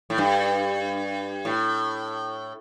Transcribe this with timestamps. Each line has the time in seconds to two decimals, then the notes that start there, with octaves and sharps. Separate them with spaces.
0.10 A2
0.18 G2
1.45 A2